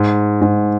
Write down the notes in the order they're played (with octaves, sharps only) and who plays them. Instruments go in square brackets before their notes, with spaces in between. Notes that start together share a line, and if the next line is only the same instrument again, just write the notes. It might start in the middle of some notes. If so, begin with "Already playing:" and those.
Already playing: [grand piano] G#2
G#2